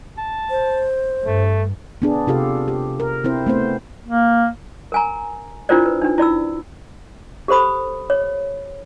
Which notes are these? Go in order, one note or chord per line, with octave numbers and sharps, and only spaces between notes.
A5
C5
G2 A3
B3 D4 G#4
C3 F4 G4 A4 F5
G4
A#4
C4 E4 C5
A3 B3 C4 C5
A#3
A#4 G#5 A#5
D4 E4 F4 A#4 C5 D5
B4
D4 D#4
E4 D5 B5 E6
G4 A4 C5 B5 D#6
C#5